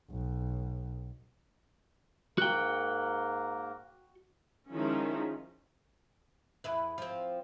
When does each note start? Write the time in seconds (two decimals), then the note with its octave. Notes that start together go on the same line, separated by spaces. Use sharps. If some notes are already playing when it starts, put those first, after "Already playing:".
0.10 B1
2.38 G#2 A#3 F#4 A#4 G5
4.71 D#3 F3 G#3 C#4 D#4 E4
6.64 E2 E4 B4
6.98 F3 C4